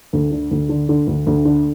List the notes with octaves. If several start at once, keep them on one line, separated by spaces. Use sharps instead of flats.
D2
D3
D2
D3
D3
D2
D2
D3